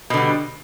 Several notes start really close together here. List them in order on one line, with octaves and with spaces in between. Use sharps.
B2 D3 G3